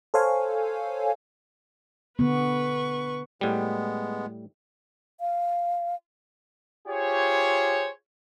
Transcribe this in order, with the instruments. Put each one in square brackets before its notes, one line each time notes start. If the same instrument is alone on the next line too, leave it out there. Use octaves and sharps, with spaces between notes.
[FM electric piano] A4 C5 C#5 F5 G#5
[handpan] D3 B3 [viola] B4 C#6
[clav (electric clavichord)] A2 G3 [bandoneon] G#3 B3
[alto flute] F5
[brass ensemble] F4 G4 G#4 C5 C#5